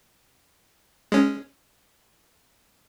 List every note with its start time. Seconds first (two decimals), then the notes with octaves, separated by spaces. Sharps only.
1.12 G#3 C#4